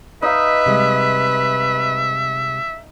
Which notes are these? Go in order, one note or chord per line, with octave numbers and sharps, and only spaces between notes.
D#4 B4 E5 F5
C3 G3 G#3